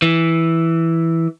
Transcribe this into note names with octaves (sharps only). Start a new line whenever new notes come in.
E3